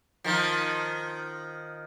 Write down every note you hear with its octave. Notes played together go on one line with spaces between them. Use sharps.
D#3 F3